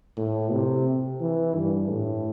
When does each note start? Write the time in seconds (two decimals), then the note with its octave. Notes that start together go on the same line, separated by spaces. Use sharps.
0.17 A2
0.52 C3
1.21 E3
1.56 G2
1.90 A2